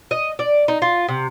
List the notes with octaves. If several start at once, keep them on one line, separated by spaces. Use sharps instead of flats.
D#5
D5
D#4
F4
C3